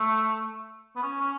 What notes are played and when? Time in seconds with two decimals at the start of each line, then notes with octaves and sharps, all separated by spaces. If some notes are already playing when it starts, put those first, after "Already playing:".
Already playing: A3
0.96 B3
1.03 C#4
1.21 C#4